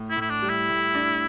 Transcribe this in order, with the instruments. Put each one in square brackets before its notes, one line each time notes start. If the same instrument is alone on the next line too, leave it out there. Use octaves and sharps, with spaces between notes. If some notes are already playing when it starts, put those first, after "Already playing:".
Already playing: [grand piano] A2
[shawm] E4
[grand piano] A2
[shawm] E4
D4
[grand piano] G3
[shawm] E4
[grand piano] A2
D4